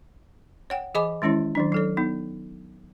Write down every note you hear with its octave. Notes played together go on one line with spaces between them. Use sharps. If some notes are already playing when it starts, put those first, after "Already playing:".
C#5 F#5 G5
E3 G#4 D#5 G#5 B5 D6
D#3 G#3 C#4 E4 C#5
D#3 F#3 D4
F#3 A4 C#5
B3 D#4